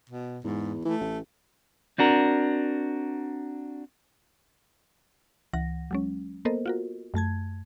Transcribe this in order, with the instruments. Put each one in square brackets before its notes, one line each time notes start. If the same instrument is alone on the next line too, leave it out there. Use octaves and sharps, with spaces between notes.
[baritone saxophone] B2
[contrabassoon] E2 [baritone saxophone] G#2
[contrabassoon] E3 [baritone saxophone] A3
[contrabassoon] A1
[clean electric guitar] C4 D4 F#4 A#4
[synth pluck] C#2 E3 F#5 A#6
F#3 G#3 C#4
A#3 B3 A4 A#4 C5 D#5
F4 F#4 A#4
F#2 A3 A5 G#6